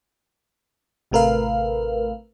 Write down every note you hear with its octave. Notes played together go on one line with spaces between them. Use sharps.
A1 C3 A3 A#4 B4 F5